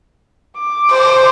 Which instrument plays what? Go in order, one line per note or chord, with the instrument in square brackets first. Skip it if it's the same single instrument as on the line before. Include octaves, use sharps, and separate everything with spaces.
[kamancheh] D6
[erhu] C5